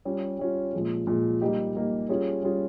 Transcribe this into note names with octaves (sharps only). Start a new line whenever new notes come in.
G3 C#4 F4
G3 C#4 F4
A#2 F3 G#3
A#2 F3 G#3
G3 A#3 D#4 G4
G3 A#3 D#4 G4
G3 C#4 F4 G#4
G3 C#4 F4 G#4